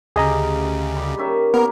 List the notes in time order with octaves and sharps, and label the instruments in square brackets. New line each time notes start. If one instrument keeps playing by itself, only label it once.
[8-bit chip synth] D2 C#3 [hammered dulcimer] G4 [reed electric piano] G#4 D#5 A#5
[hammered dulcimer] G3
D#3 C#4 E5
[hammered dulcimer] A#3 [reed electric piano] B3 [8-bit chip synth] A#4